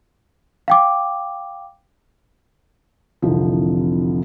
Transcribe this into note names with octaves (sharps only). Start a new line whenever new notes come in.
F5 G5 D6
F1 C2 D3 E3 F3